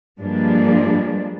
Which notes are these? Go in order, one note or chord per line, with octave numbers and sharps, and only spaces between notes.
G2 F3 G3 G#3 A#3 D4